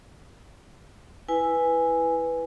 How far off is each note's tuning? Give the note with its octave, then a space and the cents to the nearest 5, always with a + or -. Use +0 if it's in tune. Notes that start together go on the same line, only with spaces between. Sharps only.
E4 +0 B4 +0 G#5 +0